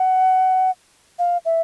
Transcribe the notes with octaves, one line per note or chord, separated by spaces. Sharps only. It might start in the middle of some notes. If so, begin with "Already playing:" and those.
Already playing: F#5
F5
E5